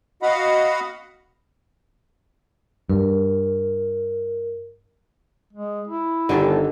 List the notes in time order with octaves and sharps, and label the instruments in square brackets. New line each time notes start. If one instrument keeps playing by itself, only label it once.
[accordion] F#4 D#5 F5 F#5 B5
[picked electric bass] G2 [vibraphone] A#4
[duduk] G#3
E4
[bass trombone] G1 [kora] D3 D#3 A4 [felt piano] D4 G4